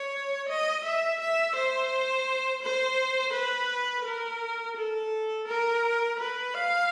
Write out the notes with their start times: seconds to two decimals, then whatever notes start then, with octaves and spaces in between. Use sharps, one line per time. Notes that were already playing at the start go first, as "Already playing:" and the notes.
Already playing: C#5
0.49 D#5
0.84 E5
1.20 E5
1.56 C5
2.63 C5
3.33 B4
4.05 A#4
4.76 A4
5.47 A#4
6.19 B4
6.54 F5